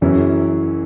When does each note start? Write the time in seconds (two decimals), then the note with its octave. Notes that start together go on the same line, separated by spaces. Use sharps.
0.01 F#1 F#2 E3 C#4 E4